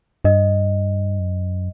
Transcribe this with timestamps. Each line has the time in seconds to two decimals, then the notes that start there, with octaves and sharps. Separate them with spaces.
0.25 G2 D#5
1.19 F#2